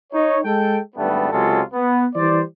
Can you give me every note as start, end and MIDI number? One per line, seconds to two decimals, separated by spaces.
0.12 0.38 63
0.12 0.38 73
0.44 0.78 56
0.44 0.78 69
0.44 0.78 79
0.96 1.27 32
0.96 1.27 43
0.96 1.27 55
0.96 1.27 57
0.96 1.27 59
1.32 1.61 37
1.32 1.61 48
1.32 1.61 54
1.32 1.61 56
1.32 1.61 65
1.32 1.61 69
1.73 2.06 59
2.15 2.41 52
2.15 2.41 55
2.15 2.41 72
2.15 2.41 74